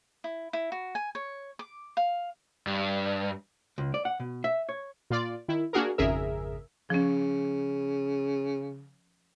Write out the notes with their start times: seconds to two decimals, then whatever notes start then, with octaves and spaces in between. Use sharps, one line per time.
0.24 E4
0.53 E4
0.72 F#4
0.95 G#5
1.15 C#5
1.59 D6
1.97 F5
2.67 G2
3.78 C#2
3.94 D5
4.05 F#5
4.20 B2
4.44 E5
4.69 C#5
5.10 A#2 F4 D5
5.48 D#3 E4
5.73 A#3 D4 F#4 G#4 A#4
5.98 G#1 F2 C#3 G#4 A#4 E5
6.90 C#3 F3 C#4